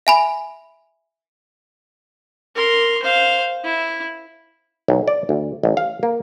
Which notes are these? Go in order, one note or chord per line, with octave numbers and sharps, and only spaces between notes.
E5 G#5 B5
A#4 C6
C5 F5
E4
B1
D5
D2
A1
F5
A#3